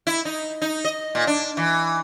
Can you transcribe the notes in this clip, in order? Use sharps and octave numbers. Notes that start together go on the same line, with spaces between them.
E4
D#4
D#4
D#5
A#2
D4
E3